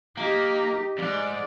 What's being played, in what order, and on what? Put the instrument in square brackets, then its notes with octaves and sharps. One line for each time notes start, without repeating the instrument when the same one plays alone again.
[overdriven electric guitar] A#3 [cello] D#4 G4
[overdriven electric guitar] F2 G#2 [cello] D5